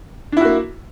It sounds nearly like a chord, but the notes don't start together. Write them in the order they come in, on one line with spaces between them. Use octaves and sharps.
D4 E4 F#4 A#3